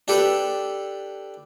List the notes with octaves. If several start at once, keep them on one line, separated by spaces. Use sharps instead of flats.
D4 G4 A4 B4